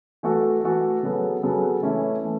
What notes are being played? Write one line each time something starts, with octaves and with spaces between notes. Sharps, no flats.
E3 A3 F#4 A4
E3 A3 F#4 A4
C#3 F#3 B3 A4
C#3 F#3 B3 A4
E3 A3 C#4 E4
E3 A3